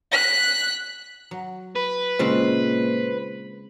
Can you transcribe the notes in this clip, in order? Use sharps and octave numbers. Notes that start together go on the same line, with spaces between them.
F#6 B6
F#3
B4
A#2 C#3 G#3 C4 C5